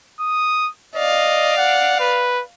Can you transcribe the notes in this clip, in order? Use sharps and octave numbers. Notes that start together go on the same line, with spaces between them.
D#6
D5 D#5 F5
F#5
B4